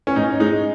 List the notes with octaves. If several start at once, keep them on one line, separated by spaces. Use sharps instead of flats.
C#4
G#2 D#4
G#3 D#4